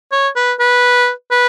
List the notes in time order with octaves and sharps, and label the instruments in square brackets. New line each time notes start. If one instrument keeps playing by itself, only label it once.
[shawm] C#5
B4
B4
B4